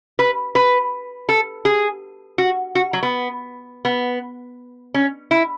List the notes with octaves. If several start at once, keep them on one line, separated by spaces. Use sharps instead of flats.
B4
B4
A4
G#4
F#4
F#4
F#3
B3
B3
C#4
E4